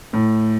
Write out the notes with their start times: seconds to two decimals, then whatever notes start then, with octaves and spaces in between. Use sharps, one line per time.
0.13 A2